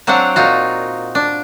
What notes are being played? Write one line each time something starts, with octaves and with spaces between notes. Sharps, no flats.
F#3 C4 D4 F5 F#5
A#2 D#4 F4 F#4
D4